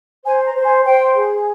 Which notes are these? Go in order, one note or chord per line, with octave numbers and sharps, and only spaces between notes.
C5 G#5
A#5
C5
G#5
C5 G5
G#4